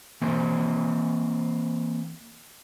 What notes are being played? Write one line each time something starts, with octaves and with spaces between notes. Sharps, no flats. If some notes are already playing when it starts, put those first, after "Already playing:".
E3 A#3 C4 C5